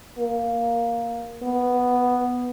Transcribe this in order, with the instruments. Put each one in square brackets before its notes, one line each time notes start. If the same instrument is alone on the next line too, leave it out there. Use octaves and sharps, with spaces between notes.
[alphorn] A#3
B3